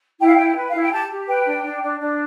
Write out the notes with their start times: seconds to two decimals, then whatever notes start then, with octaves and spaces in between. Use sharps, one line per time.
0.20 E4 G5
0.27 F5
0.35 E4 G5
0.56 B4
0.69 F5
0.74 E4
0.81 G5
0.92 G4 A5
1.10 G4
1.27 B4 G5
1.46 D4
1.64 D4
1.82 D4
2.00 D4